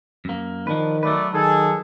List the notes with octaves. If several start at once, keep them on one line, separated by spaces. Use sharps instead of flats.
F#2 A#3
D#3 F3 D4 B4
F#3 A3 B4 D5
D#3 G#4 A4